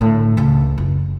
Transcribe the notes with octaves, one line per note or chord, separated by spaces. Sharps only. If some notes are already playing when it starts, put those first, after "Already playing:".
A2 D3
C#2 C#3
F#1